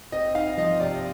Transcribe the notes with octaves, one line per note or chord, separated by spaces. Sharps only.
C4 D#5
D#4 F5
F3 D#5
C3 D5